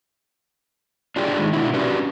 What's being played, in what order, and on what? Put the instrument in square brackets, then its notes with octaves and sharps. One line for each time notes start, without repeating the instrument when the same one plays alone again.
[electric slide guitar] D4 F4 G4 G#4
D#3 E3 G#3
B2 D4 E4
C#4 D4 F#4 G4 B4